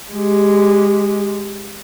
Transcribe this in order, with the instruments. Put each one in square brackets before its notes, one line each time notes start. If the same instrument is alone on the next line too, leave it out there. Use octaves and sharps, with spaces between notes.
[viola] G#3 G4